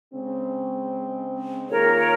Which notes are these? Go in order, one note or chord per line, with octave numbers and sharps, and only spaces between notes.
C#3 G#3 C4
D#3 A#3 F4 G#4 A#4 C#5